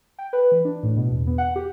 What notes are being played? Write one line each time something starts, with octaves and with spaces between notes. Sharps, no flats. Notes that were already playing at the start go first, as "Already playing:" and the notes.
G5
B4
E3
D4
A2
B2
E2
B3
F#5
G4